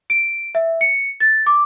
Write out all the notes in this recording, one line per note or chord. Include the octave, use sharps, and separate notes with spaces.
D7
E5
C#7
A6
D6